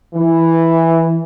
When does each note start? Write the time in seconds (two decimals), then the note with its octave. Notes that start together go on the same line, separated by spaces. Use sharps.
0.15 E3